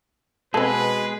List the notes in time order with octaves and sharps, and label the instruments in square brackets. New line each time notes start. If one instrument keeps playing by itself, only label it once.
[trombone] B2 [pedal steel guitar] G#3 G#4 [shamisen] C4 A4 [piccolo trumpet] B4